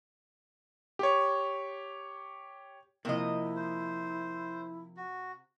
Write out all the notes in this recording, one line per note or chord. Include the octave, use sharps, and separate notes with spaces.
G4 C#5
C3 F3 A#3 E4 D#5
C5
F#4